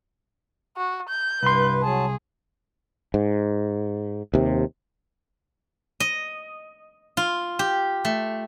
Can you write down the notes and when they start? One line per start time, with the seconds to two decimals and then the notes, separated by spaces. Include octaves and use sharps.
0.76 F#4
1.09 G6
1.43 C2 G2 B4 C6
1.83 F#3 G#4 A5
3.14 G#2
4.34 D#2 C3
6.00 D#5
7.17 F4
7.59 G4
8.05 A3